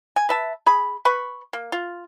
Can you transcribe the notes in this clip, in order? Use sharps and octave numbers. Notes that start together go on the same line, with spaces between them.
G#5
B4 E5 A5
G#4 B5
B4 B5 C#6
A#3
F4